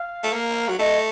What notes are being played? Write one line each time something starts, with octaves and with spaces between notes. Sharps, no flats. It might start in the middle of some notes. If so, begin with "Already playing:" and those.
Already playing: F5
A3
A#3
F#3
A3 D#5